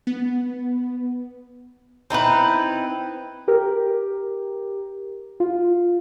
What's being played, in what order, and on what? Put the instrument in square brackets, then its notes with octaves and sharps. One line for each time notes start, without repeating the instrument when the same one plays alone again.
[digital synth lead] B3
[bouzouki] C4 D#4 E4 B4
[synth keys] G4 A#4
F4